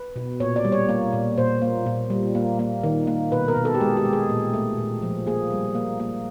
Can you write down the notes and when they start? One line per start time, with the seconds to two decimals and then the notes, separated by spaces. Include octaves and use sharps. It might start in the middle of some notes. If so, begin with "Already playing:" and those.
Already playing: B4
0.16 B2
0.40 A#2 C#5
0.56 D5
0.65 G3
0.72 C#5
0.89 A#3
1.13 A#2
1.38 A#2 C5
1.62 A#3
1.86 A#2
2.10 G3
2.35 A#3
2.59 A#3
2.83 D#3
3.07 A#3
3.32 B2 B4
3.48 A#4
3.56 B2
3.65 A4
3.74 G4
3.81 G#3 G#4
3.97 G4
4.05 G#3
4.13 G#4
4.29 A#2
4.54 A3
4.78 A#2
5.02 F3
5.27 A#3 G#4
5.51 G3
5.75 A#3
6.00 A#3